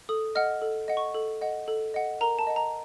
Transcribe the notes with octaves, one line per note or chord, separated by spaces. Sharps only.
A4 D#6
D#5 F#5 F6
A4
D#5 F#5
C#6
A4
D#5 F#5
A4
D#5 F#5
A#4 A#5
A5
D#5 F#5
A#5